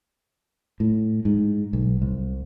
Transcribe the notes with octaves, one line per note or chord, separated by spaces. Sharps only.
A2
G#2
B1
C2